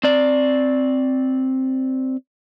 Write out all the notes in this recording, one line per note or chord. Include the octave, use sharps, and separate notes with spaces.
C4 D5